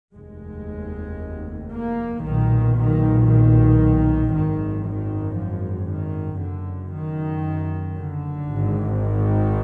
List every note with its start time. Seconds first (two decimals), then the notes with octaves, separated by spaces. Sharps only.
0.14 F1 D#2 G#3
1.72 A#3
2.23 B1 A#2 D#3
2.75 D#3
3.27 D#3
4.32 G#1 F#2 D#3
4.84 D#3
5.36 F3
5.88 D#3
6.40 F#1 F#2 D3
6.92 D#3
7.97 D3
8.49 G#1 G#2
9.01 D#3